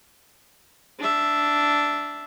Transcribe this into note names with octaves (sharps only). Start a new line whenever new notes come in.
D4 E5